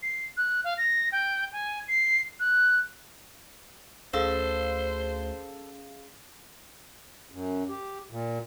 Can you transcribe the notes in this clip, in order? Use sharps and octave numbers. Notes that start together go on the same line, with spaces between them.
C7
F#6
F5
A#6
G5
G#5
C7
F#6
D2 C#4 G#4 A4 C5 F5
F#2
G4
A#2